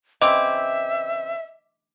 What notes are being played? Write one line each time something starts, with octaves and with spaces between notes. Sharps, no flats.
C#3 E3 C4 D#5 E5 D6